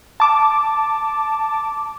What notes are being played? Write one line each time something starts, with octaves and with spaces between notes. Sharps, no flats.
A5 D6